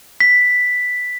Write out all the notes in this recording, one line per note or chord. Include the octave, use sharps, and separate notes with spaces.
B6